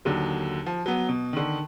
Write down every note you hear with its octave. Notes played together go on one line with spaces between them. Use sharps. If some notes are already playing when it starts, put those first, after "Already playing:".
D#2 D3 F#3
F3
F#3 B3
B2
D3 D#3